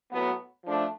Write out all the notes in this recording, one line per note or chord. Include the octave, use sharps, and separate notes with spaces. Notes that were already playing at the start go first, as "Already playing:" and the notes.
A2 F#3 B3
F3 A3 D4